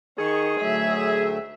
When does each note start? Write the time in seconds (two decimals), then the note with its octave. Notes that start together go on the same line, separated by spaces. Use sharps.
0.18 D#3 G#4 C#6
0.60 D2 F#3 A3 E5